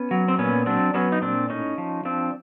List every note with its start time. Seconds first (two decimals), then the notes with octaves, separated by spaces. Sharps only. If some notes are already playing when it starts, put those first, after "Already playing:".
Already playing: B3 C#4
0.11 F#3
0.28 C4
0.38 A#2 B3 C#4
0.66 F#3 C4 D4
0.94 F#3 B3 C#4
1.12 D#4
1.22 A#2 C4 D4
1.50 A2 C#4 D#4
1.78 F3
2.05 F3 C4 D4